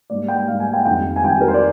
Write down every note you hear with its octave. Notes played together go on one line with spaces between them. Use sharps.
G#2 G3 A#3 D5
G5
G#2 G3 A#3 F5
G#5
G5
F2 D#3 G3 G5
G#5
F2 D#3 G3 G5
A#4
C5
D5